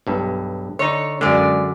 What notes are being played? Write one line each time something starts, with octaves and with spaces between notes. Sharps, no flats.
B1 G2
D3 D#4 C#5
F#2 D3 G#3 D5